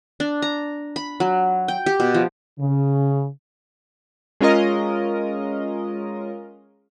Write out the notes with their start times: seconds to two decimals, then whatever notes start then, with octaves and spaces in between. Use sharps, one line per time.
0.20 D4
0.42 A#5
0.96 B5
1.20 F#3
1.68 G5
1.86 G4
2.00 B2
2.14 F3
2.60 C#3
4.41 G#3 C#4 F4 A#4 D#5